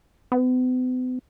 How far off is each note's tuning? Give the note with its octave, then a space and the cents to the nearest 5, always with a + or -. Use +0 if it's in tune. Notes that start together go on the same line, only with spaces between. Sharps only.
B3 +45